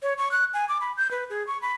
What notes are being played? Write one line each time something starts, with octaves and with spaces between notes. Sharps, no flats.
C#5
C#6
F#6
G#5
D6
B5
G6
B4
G#4
C#6
B5